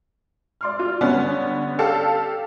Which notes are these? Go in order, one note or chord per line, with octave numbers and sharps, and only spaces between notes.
D5 C6 F6
F4
D3 G3 B3 C#4 D4
G4 A4 F5 A5